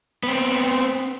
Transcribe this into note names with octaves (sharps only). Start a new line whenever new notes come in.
B3 C4